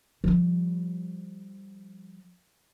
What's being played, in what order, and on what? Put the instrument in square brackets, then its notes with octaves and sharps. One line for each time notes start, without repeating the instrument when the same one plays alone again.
[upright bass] F3 G3